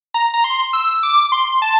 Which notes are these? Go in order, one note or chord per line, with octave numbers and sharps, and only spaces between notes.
A#5
A#5
C6
E6
D6
C6
A5